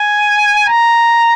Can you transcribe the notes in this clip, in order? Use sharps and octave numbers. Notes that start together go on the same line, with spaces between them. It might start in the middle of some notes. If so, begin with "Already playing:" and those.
Already playing: G#5
A#5